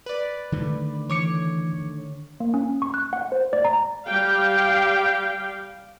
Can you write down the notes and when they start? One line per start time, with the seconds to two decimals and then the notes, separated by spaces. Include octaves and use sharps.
0.06 B4 D5
0.52 D3 D#3 A3
1.10 E3 C#5 D6 C#7
2.40 A#3
2.54 C#4
2.82 C#6
2.94 F#6
3.13 F#5
3.32 C5
3.53 D5
3.65 A#5
4.07 G3 G4 F5 G5